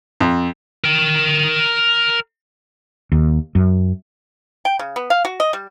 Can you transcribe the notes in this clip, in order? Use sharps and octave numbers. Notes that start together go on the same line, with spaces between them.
F2
A#4 G5
D#2
F#2
G5
C#3
B3
F5
F#4
D#5
G3